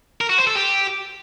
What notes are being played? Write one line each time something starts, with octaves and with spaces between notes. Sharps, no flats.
A#4
F#4
C5
A4
G4